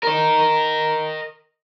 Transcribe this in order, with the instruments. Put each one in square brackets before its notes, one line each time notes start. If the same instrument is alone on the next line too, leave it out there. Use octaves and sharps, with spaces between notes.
[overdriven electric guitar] A#4 D#5